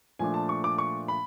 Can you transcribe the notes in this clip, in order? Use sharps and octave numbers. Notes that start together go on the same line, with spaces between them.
A#2 F3 A3 D4 G#5
A5
C#6
D6
C#6
B5